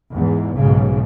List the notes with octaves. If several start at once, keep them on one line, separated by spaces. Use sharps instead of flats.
E2 G#2
B1 G#2 C#3